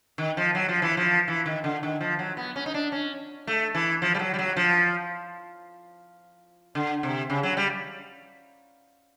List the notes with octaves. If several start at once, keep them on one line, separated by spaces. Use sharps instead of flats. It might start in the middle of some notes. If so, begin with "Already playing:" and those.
D#3
F3
F#3
F3
E3
F3
E3
D#3
D3
D#3
F3
F#3
B3
C#4
D#4
D4
C#4
A3
E3
F3
G3
F#3
G3
F#3
F3
D3
C3
C#3
F#3
G3